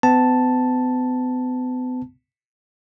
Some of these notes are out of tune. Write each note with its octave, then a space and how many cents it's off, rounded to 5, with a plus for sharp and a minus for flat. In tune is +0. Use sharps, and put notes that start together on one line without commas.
B3 +40 A5 +0